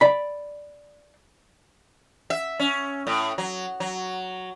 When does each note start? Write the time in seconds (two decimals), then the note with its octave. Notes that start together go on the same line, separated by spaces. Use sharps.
0.01 D5 B5
2.30 E5
2.60 C#4
3.07 A2
3.38 F#3
3.80 F#3